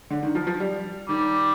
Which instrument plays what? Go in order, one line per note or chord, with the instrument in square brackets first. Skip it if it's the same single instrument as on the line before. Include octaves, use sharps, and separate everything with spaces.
[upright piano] D3
D#3
F3
F3
G3
[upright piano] D#3 [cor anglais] G3